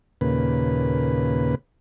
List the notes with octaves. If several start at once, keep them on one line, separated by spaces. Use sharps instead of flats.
D#2 A#2 C#3 B4